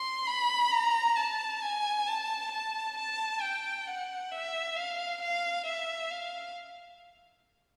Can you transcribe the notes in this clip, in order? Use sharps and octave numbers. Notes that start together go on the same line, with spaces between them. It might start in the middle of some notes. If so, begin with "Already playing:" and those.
Already playing: C6
B5
A#5
A5
G#5
A5
A5
A5
G5
F#5
E5
F5
F5
E5
F5